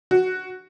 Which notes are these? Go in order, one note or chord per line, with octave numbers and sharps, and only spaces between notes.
F#4